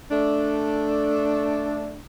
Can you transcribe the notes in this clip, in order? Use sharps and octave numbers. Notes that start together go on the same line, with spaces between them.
A3 D4